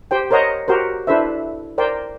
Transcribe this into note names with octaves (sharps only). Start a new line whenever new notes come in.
G4 C5 G5
A#4 C5 C#5 D#5 F#5 A#5
F#4 G4 A#4 C5
D4 E4 A4 B4 C5 E5
A#4 C5 D5 G5